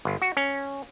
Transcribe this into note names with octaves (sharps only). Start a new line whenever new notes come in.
G1
F#4
C#4